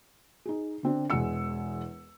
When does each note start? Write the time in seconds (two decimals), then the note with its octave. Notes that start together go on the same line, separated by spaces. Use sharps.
0.46 D#4 G#4
0.83 D3 C4 D4
1.10 E1 E2 G#3 F#5 E6 C#7